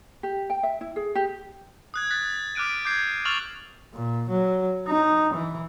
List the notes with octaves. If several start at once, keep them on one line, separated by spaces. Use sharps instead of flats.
G4
G5
E5
E4
G#4
G4
D#6 F#6 G#6
F#6 A6 B6
D6 F6 F#6 D7 D#7
D6 G6 G#6 C7
C#6 E6 F6 A6 F7 F#7
A#2
F#3
D#4
E3